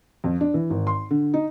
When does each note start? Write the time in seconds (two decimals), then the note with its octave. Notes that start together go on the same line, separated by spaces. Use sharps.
0.24 F2
0.41 D4
0.54 E3
0.70 G#1
0.87 C6
1.11 D3
1.34 D#4